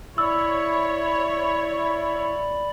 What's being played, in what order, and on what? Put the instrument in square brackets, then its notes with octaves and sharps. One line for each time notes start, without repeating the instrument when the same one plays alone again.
[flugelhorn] E4 [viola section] C#5 [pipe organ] D5 B5 [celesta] E6